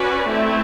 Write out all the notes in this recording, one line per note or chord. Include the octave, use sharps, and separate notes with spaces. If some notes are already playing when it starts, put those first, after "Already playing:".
Already playing: C#4 F#4 B4 D5
A3 C4 E4